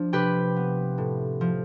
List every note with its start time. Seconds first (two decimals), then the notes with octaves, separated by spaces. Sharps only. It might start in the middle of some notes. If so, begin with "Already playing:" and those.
Already playing: F3 D4
0.13 C3 G4 B4
0.56 B3
0.98 A2
1.41 F3